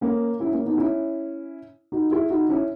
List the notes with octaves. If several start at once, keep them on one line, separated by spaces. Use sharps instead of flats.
A#3 C#4
C#4 E4
A#3 C#4
B3 D#4
C#4 E4
D#4 F#4
E4 G#4
D#4 F#4
C#4 E4